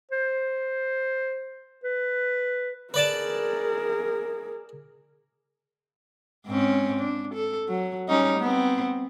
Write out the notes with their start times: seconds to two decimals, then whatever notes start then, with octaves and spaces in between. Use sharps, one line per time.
0.12 C5
1.84 B4
2.94 G#4 A#4 B4 D5 A5
6.47 G#2 C4 C#4
6.99 D4
7.34 A4
7.68 F#3
8.09 G3 C#4 D#4
8.39 B3 C4